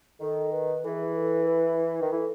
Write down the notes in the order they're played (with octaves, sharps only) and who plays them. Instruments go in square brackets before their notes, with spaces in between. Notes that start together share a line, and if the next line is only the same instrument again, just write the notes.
[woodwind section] D#3 [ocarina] A4
[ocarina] B4
[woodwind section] E3 [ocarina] G#4 A4
[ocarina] A4
B4
[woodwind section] D#3
[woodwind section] E3 [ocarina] A4